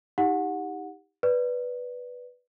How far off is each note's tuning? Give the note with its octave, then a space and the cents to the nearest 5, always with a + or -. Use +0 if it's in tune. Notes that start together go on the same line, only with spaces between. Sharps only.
D#4 +35 G4 +15 F#5 -20
B4 +0 D5 +0